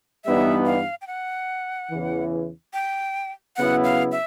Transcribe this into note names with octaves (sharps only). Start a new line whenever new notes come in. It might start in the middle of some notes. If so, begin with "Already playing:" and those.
G2 E3 G3 B3 D#4 E5
F5
G5
F#5
E2 C#3 E3
G5
C#3 F#3 B3 E4 F#5
F5
E5